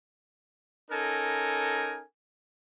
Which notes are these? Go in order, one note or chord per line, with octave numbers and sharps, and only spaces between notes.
C#4 D#4 A4 A#4 G#5